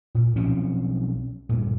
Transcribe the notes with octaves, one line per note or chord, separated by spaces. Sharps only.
A#2
B1 F3 C4 C#4
D2 G2 A#2